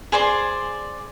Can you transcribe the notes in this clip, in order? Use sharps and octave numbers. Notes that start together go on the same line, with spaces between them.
G#4 C5 D5 C6